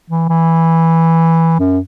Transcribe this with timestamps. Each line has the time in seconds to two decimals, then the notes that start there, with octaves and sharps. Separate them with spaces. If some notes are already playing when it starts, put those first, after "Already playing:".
0.10 E3
0.29 E3
1.59 F#2